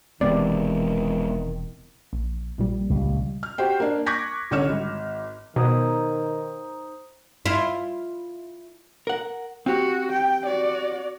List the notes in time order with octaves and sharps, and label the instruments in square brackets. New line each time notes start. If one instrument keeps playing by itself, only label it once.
[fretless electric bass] E1 E2 C3 [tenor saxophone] D#3 [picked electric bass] G#3 B3 [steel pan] D5
[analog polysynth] A#1
A#1 A#2 G3
[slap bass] C#2
[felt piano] F6
F#4 G4 C5 G5
A#3 D4
C#6 D6 F#6 G#6 A#6 B6
C2 D3 C#4 C#5 F6 E7
G#1
[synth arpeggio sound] B2 [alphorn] D#3 [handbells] D#4 C5 D#6
[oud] E4 F4
[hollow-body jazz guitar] A#4 F#5
[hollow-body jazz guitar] C4 G4 [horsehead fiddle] F#4
[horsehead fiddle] G5
F#4 D5